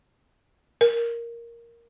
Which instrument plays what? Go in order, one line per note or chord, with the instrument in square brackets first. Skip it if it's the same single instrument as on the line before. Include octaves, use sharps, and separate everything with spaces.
[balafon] A#4